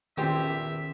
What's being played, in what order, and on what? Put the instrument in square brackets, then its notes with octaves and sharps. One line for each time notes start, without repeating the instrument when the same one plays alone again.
[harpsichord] A#1 E2 [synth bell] D#3 C#4 [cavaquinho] G4 C5 [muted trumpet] E5